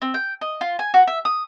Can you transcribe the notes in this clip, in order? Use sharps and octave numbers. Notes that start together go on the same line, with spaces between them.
C4
G5
D#5
F4
G#5
F#4
E5
D#6